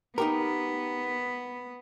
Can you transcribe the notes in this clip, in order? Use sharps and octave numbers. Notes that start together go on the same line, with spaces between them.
B3 D#4 G4 A#4